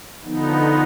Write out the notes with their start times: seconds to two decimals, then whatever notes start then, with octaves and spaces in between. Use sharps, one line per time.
0.23 D3 F3 B3 D#4